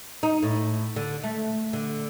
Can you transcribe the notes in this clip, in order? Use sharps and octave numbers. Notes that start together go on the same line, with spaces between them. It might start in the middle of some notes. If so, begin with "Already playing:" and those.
D#4
A2
D3
A3
D3